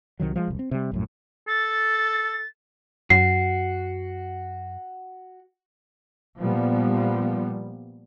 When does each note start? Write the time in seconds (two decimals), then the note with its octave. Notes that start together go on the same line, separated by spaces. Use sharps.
0.20 C2 C3 D#3 F#3
0.36 F3 G3 G#3
0.48 E1 C2
0.59 C4
0.71 C3 G3
0.92 A#1 F#2 A2
1.48 A4 A6
3.10 F#2 F#4 C7
6.40 A#2 F3 G3 B3